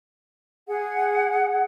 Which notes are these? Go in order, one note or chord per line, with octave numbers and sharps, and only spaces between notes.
G#4 F#5